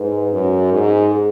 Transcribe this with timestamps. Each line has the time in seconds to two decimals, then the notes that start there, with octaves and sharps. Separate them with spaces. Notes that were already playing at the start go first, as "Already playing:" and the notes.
Already playing: G#2 B4
0.32 F#2
0.72 G#2
1.11 G#4